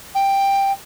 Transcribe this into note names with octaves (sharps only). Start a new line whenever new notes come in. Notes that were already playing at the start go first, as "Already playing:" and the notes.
G5